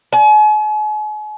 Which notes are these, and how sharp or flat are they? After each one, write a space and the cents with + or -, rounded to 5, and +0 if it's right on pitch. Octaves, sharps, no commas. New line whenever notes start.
G#5 +40